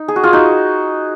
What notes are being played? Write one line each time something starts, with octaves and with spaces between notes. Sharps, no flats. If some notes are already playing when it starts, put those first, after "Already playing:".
Already playing: D#4
G#4
F#4
F4 G#4
D#4 F#4